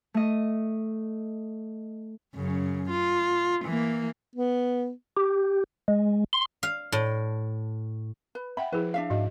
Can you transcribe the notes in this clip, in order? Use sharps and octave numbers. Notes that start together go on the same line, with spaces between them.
A3 D#5
F#2 C#3
F4
E3 A#3
B3
G4
G#3
C6
F5
A2
B4
E5 F#5 G5 B5
F3 E4 G#4 B4
D4 E5 F5
G#2 F#4 D#5